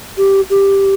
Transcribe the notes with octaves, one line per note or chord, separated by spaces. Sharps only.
G4
G4